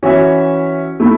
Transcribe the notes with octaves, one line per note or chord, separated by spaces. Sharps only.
E3 C#4 F#4 C#5 E5
A3 E4